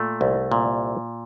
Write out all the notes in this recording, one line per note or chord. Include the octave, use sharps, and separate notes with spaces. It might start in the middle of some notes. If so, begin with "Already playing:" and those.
Already playing: A#2 A3
C2
A#2